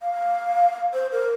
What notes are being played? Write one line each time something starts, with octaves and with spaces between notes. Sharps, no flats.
F5
C5
A#4